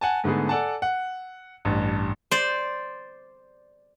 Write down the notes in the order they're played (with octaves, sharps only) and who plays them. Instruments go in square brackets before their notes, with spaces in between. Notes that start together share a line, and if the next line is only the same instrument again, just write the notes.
[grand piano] F#5 G#5 A5
G#2 D3 A3 B3 G#4
A4 D5 F#5 G#5 A5
F#5
A1 G2
[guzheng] C5 D5